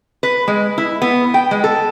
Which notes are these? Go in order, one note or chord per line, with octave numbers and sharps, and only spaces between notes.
B4
G#3
E4
B3
G5
G#3
A4